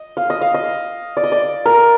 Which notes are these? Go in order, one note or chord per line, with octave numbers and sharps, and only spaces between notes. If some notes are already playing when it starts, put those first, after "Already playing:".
Already playing: D#5
F5
D#5
F5
D#5
D5
D#5
D5
A#4